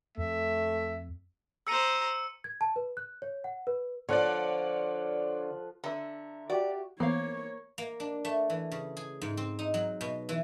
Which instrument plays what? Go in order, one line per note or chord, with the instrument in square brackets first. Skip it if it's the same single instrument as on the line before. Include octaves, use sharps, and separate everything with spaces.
[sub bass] F2 [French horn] A3 [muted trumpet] E5
[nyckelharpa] C5 A#5 [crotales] E6 C#7 D#7
[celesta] G#6
A5
B4
F#6
C#5
F#5
B4
[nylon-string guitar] D3 [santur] F3 F4 F#5 [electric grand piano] C#5 D5
[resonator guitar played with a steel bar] D3 [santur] E5 A#5
[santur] F#4 G4 [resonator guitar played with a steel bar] D5
[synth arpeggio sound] E3 B3 [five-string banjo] A#3 C5 F5 [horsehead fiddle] C#5
[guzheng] A#3
D4
A3
E3
C#3
G#4
G#2
C4
D#4
F#3
B2
E3